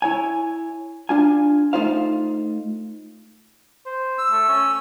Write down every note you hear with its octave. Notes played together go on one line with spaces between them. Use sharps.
E4 C#5 G#5
D4 F4 G#5
A3 D#4 F4 C5 F5
C5
E6
A3
C#4